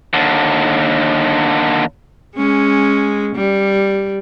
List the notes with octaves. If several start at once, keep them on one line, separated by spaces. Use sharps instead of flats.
D#2 D3
G#3 C#4
G3